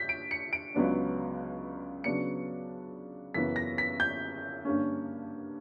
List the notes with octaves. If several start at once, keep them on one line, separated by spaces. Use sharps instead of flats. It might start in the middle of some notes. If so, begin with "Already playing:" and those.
Already playing: G2 G6 B6
D7
C#7
D7
C#2 C#3 F#3 B3 D4
C#3 F#3 B3 D4 C#7
F#2 C#3 E3 B3 B6
A#6
B6
G6
G2 D3 A#3 C#4